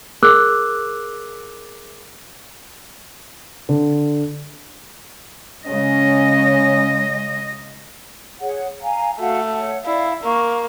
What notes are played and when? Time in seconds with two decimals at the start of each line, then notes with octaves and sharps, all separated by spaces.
0.23 G#4 A#4 D6 E6 F#6
3.69 D3
5.67 C#3 G#3 C#4 D#5
8.39 G#4 C#5 F#5
8.81 F5 G#5 A#5
9.19 A3 F#4 F5 F#5
9.51 C#5 F#5
9.84 E4 D5 F5
10.24 A#3 C#6